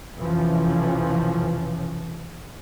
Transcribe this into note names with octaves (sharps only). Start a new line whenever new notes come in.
B1 F2 C3 E3 F3 C#4